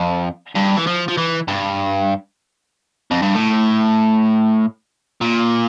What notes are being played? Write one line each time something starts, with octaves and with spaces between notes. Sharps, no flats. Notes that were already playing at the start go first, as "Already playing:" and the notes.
Already playing: F2
G2
E3
F3
F3
E3
G2
F2
G2
A2
A#2